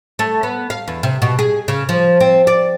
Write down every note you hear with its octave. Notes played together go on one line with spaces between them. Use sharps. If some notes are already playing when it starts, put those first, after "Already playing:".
A3
B3
F5
E2
C3
B2
G#4
C#3
F3
C4
D5